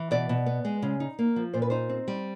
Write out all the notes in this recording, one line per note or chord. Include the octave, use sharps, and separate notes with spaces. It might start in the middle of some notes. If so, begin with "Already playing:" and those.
Already playing: E3
B2 D5
B2
B3
G#3
C#3
D#4
A#3
F3
A#2 C5
B4
D#4 C5
C4
G3